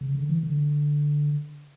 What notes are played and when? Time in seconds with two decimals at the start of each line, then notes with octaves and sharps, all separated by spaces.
0.01 C#3
0.15 D3
0.30 E3
0.43 D3